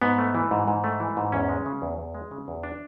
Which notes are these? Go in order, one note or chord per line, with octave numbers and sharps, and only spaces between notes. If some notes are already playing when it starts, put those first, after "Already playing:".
G#2 B3
A3
E3
G#2
G#2
A3
E3
G#2
E2 C#4
G#3
C#3
E2
E2
G#3
C#3
E2
D4